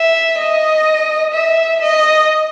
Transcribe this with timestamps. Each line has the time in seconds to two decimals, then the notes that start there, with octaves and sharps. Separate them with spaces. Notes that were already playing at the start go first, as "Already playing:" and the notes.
Already playing: E5
0.39 D#5
1.34 E5
1.82 D#5